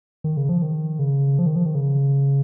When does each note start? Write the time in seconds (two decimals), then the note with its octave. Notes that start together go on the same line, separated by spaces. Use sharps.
0.24 D#3
0.37 C#3
0.49 F3
0.62 D#3
0.99 C#3
1.39 F3
1.46 D#3
1.56 F3
1.66 D#3
1.75 C#3